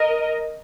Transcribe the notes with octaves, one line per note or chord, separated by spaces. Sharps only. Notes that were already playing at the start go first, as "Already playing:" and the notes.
Already playing: A#4 D#5